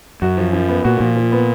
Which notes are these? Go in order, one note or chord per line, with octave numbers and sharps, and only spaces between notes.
F#2 F#4
F3
F3
B3
A#2 F#4
A#2 F3
F3
B3